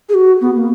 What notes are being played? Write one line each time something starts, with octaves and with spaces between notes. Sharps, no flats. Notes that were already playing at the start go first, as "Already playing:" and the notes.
G#4
F#4
B3
A#3